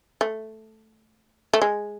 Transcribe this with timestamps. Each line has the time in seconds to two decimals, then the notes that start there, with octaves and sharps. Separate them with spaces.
0.21 A3
1.54 A3
1.62 G#3